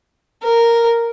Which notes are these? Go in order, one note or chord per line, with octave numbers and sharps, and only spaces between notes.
A#4